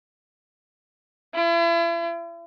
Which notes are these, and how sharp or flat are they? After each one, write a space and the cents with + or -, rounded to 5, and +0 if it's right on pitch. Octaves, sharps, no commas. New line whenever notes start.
E4 +40